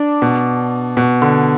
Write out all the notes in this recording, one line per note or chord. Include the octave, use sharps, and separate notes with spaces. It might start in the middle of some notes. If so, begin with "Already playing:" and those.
Already playing: D4
B2
B2
D3